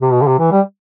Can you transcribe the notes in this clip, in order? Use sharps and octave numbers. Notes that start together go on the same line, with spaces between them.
C3
B2
D3
C3
E3
G3